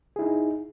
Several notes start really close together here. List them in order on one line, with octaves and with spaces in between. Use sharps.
G#4 E4 D#4